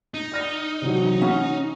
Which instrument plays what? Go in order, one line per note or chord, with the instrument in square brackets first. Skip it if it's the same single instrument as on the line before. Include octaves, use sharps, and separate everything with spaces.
[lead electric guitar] D#4
[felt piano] D5 F6 A#6
C3 E3 F#3
[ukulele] C#4 [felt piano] F#5